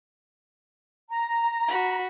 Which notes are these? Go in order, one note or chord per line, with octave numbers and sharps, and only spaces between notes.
A#5
F#4 B5